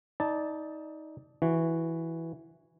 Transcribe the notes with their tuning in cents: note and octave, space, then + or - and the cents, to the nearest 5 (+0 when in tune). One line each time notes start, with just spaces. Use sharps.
D#4 +20 D5 +5 A5 +0
E3 +0 F#4 +0